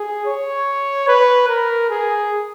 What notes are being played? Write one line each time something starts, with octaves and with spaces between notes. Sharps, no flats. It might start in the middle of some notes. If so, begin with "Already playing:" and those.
Already playing: G#4
C#5
B4
A#4
G#4